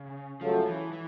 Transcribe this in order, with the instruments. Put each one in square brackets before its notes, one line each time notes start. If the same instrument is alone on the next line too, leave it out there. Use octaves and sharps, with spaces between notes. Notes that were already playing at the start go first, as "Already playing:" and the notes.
Already playing: [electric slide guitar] C#3
[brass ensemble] C#2 C#3 F#3 A3 [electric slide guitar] F3
[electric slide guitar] E3
E3